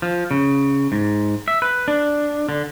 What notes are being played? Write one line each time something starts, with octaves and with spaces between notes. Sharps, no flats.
F3
C#3
G#2
E5
B4
D4
D3